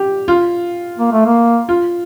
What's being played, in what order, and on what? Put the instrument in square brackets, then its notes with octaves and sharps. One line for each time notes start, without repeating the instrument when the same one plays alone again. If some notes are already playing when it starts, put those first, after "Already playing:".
Already playing: [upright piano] G4
F4
[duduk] A#3
A3
A#3
[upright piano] F4